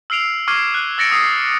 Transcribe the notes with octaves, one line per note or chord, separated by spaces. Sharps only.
E6 F6 C7 D7 F7
C#6 D6 F6 G#6 C7
F#6
E6 A6 A#6 C#7 D7
D#6 C7